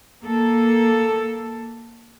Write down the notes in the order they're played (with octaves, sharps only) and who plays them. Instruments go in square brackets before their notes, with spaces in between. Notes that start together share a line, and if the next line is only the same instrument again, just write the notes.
[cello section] A#3 A4